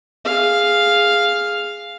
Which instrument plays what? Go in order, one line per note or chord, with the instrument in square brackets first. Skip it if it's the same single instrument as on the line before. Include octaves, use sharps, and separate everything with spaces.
[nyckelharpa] G#4 F5